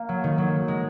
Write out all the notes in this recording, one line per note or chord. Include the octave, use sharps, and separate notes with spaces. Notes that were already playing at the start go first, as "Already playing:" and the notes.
Already playing: A#3
F#3
D#3
F#3
G#3